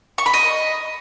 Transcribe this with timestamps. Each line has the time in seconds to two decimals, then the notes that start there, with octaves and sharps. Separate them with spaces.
0.18 C#6
0.26 B5
0.34 D#5